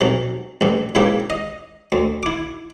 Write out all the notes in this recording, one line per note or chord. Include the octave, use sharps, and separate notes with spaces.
B1 C3
A1 G2
G#2 C#3 E3 A#3 G4
D#5
D2
E4 D6